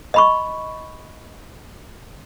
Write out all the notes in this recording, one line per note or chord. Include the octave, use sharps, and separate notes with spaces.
D#5 B5 C#6